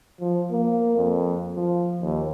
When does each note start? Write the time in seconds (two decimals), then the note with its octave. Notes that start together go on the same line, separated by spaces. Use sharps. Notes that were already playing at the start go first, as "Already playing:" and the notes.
0.20 F3
0.51 A#3
0.97 F2
1.55 F3
2.02 D#2